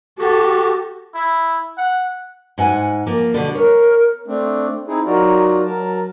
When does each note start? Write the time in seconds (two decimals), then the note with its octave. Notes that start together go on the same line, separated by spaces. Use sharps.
0.19 F#4 G4 A4
1.14 E4
1.78 F#5
2.58 G#2 F#5 G#5
3.06 F3 A#3
3.34 B2 D3 G3
3.55 A#4 C#5
4.27 A3 C4 D4
4.88 C4 D#4 E4 G#4
5.06 F#3 D#4 F4 F#4 A#4 D5
5.65 F#3 A#4 A5